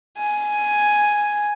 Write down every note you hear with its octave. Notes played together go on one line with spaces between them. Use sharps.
G#5